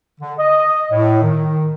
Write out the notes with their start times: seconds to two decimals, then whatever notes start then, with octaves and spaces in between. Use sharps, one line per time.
0.21 D3
0.39 D#5
0.92 A2
1.23 D#3